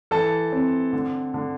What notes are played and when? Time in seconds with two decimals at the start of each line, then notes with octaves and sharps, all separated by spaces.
0.11 E3 A4 A5
0.52 C4
0.93 D3
1.34 D3